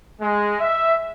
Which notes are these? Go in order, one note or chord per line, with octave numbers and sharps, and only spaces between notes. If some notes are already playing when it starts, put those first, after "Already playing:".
G#3
E5